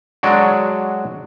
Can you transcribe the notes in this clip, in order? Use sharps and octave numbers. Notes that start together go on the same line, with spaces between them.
F#3 G#3 D4 F#4